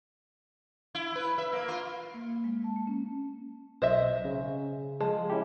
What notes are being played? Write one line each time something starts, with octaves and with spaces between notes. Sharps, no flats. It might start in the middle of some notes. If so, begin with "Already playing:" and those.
E4
B4
E5
A#3
F4
A#3
A#3
G#3
A5
A#3
C#4
B1 C5 D#5 E5
C#3 C#4
F3 G#3
C#4 E4 G4